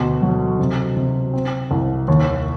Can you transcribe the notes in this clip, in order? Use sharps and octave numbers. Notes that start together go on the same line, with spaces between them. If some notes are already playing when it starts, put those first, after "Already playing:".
Already playing: D2 B2
F#3
C3
C3
C4
C2
D#2